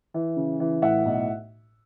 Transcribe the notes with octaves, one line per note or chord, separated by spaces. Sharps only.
E3
C#3
E3
A2 E5 F#5
B1